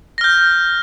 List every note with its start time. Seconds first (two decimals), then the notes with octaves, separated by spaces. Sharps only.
0.18 A#6
0.21 F6
0.24 G6